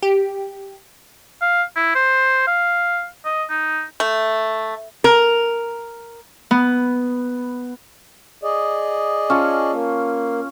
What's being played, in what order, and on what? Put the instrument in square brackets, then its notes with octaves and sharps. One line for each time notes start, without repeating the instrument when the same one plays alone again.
[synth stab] G4
[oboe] F5
E4
C5
F5
D#5
D#4
[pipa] A3
[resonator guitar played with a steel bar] A#4
[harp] B3
[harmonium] G#4 D5 D#5
[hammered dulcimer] C#4 F4 A5
[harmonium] A#3